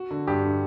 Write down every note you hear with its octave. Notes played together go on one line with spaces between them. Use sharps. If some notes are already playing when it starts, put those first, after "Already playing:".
Already playing: F#4
D3
G2 G4
D3